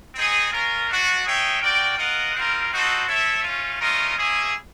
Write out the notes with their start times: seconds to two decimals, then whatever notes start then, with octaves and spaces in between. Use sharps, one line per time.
0.15 C4 D#4 G#4
0.52 C#4 F4 A#4
0.88 A3 D4 F#4
1.25 D#4 G#4 C#5 E5 G5
1.61 F#4 A#4 D5 G5
1.98 F4 A#4 D#5 F#5
2.34 G3 C4 F4 A#4
2.70 C4 D#4 F#4 A4 C5
3.07 E4 A4 C#5 E5
3.43 A3 C#4 F4
3.80 A3 C#4 F4 A#4 D#5
4.17 A#3 C#4 E4 G#4